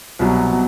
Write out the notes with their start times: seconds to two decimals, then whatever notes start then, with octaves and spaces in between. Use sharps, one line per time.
0.19 C2 B2 F#3
0.53 B2